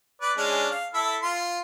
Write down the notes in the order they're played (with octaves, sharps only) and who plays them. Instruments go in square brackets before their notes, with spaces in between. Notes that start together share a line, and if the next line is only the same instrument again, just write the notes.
[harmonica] B4 D5
G#3 C#4 D4
F5
E4 A4 E5
F4 C6